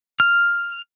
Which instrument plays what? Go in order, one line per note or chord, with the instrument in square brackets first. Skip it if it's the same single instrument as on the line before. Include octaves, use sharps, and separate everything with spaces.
[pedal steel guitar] F6